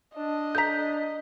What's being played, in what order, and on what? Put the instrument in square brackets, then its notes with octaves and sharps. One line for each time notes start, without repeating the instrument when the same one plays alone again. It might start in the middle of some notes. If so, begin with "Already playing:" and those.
[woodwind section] D4 [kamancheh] D#5
[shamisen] A4 E5 A#5 [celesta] G6 B6